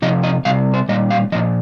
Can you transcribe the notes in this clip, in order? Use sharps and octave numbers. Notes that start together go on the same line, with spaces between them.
C3 F3 D#5
D#5
C3 G3 F5
C5
A#2 G3 D#5
F5
A#2 F3 D#5